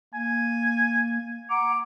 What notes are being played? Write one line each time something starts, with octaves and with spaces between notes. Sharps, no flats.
A#3 G#5
F#5 A#5 D6